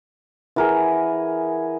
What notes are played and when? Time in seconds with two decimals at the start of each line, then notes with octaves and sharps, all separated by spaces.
0.56 E3 G#4 A#4 F#5